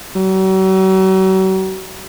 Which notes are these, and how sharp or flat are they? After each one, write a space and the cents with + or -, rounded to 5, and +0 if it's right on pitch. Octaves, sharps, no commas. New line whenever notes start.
F#3 +40